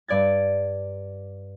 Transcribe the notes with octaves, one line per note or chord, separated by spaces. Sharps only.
G2 D5 G#6 A6